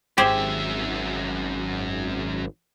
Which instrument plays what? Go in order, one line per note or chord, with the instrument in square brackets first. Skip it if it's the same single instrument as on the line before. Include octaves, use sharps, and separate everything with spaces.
[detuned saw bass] G#1 [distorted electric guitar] F#2 E5 [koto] G4 G#4 C5